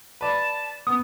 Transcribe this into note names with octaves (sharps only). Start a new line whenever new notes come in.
B4 D5 A5
B3 D#6